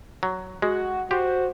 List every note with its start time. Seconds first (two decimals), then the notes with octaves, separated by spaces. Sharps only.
0.23 F#3
0.62 G#3 F#4
1.11 F#4 G4 C5